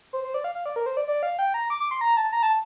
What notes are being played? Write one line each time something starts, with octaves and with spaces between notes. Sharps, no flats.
C5
C5
D5
F5
F5
D5
A#4
C5
D5
D5
F5
G5
A#5
D6
D6
C6
A#5
A5
A#5
A5